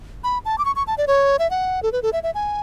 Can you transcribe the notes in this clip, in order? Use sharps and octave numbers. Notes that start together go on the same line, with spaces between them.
B5
A5
D6
C#6
C#6
A5
D5
C#5
E5
F#5
A4
B4
A4
E5
E5
G#5